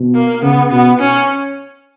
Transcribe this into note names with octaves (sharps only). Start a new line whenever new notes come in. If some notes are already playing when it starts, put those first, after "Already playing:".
Already playing: B2
A#3
C#3 B3
B2 B3
C#4